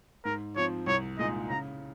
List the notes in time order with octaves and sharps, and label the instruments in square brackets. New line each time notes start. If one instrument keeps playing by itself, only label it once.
[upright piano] G#2 [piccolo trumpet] A#4
[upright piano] F3 C4 [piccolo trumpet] C#5
[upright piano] C2 [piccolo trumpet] C#5
[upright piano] A#2 G#3 D#4 G#4 [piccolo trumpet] D#5
[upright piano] C#3 [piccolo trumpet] A#5